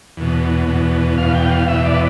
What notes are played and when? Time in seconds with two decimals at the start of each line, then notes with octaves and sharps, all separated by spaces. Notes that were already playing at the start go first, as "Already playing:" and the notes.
0.17 E2 B2
0.68 E2 B2
1.18 E2 B2 F5
1.35 G5
1.51 F5
1.68 E2 B2 E5
1.85 D5
1.94 B4